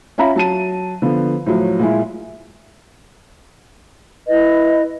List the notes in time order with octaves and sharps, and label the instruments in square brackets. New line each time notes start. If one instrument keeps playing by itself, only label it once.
[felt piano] C#4 F4 E5 A#5 B5
F#3 A5 D#7
D3 F3 B3
A2 F3 F#3
A#2 G#3 E4
[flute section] E4 B4 D#5